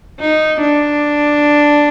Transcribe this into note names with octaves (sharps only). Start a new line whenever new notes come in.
D#4
D4